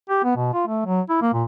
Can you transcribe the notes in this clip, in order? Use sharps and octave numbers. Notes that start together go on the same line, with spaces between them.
G4
B3
B2
F4
A3
F#3
E4
A#3
A#2